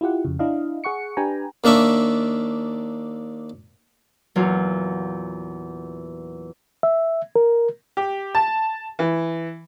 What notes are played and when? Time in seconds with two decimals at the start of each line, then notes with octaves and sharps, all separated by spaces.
0.01 E4 F4 G4 F#5
0.25 F2 C#3
0.39 D4 E4 D#5 F5
0.84 G#4 F#5 C#6 C#7
1.17 D4 G4 B4 G5 G#5 A#5
1.64 D#2 A#3 D4 E5 C#6
4.36 E2 A#2 F#3 F5
6.83 E5
7.36 A#4
7.97 G4
8.35 A5
8.99 E3